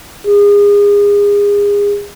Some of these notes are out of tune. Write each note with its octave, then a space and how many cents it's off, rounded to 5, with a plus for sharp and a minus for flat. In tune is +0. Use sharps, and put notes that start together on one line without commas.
G#4 -30